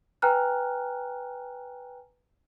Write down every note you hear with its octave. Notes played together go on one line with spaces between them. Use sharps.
B4 G5 G#5 A#5 F6 F#6